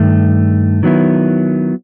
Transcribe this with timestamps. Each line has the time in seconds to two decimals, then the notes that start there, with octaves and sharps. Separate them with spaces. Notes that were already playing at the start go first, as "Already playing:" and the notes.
Already playing: G2 D#3 A3
0.83 D#3 F#3 B3 E4